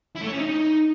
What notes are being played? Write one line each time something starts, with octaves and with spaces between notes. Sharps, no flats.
E4
A3
C#5
C#4
D#4